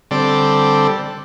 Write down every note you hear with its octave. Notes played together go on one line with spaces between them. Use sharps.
D3 G3 C4 A4 D5